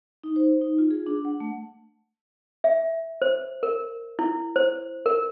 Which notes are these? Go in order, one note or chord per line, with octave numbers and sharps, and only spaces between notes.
D#4
C5
D#4
F4
G#4
D4
F#5
A3
E5
C5
A#4
E4
C5
A#4